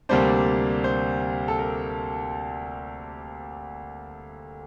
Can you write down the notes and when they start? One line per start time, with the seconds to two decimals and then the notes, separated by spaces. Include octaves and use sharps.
0.09 D2 C3 G3 A#3 D4 C5
0.84 C5
1.48 A4
1.59 A#4